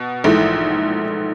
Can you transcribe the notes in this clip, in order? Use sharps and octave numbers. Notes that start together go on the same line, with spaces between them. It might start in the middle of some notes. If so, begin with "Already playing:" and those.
Already playing: B2
A#1 G#2 E3 A3